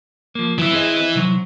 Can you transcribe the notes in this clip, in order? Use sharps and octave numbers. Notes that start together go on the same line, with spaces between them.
F3 A#3
F#2 E3 E4
C4 G#4 D#5
C3 F#3